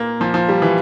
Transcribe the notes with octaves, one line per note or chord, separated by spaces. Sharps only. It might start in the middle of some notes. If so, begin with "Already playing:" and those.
Already playing: A#2 A#3
A#2 F3
F3
G3
E3